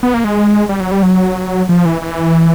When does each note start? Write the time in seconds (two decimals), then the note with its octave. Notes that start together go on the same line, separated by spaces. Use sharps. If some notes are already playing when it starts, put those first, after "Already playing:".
0.03 B3
0.14 A#3
0.24 G#3
0.69 G3
0.80 F#3
0.92 G3
1.03 F#3
1.69 F3
1.85 E3
2.02 E3